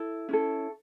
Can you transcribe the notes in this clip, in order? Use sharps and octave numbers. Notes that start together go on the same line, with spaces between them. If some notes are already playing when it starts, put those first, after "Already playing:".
Already playing: E4 A4
C#4 E4 A4